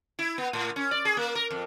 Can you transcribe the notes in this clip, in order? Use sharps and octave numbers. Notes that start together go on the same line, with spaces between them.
E4
B3
A2
C#4
D5
G#4
A#3
A#4
F2